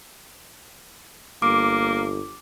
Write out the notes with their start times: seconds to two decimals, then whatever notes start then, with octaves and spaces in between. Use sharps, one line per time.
1.42 G1 A#3 D6